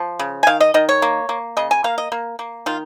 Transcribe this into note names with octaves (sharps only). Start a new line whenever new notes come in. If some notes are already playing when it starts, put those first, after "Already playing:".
Already playing: F3
C#3
G#5
D#3 F5
D#5
D#3 D#5
C#5
A#3
A#3
C#3 D#5
G#5
A#3 F5
D#5
A#3
A#3
D#3 F4